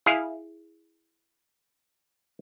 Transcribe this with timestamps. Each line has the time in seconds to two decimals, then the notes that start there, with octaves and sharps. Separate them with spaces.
0.06 E4 G#4 F5